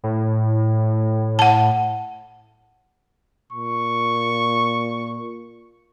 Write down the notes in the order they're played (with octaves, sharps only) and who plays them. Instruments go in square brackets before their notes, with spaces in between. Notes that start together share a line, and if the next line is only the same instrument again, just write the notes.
[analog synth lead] A2
[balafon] F#5 A5
[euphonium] A#2 [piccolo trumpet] C#6